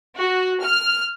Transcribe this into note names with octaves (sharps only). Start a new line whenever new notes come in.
F#4
F6